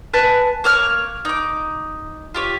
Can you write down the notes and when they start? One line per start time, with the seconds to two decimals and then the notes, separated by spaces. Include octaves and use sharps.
0.14 B4 G#5 A5 F#6
0.64 A#3 C#5 F6 F#6
1.25 D#4 D6
2.34 F4 G4 C#5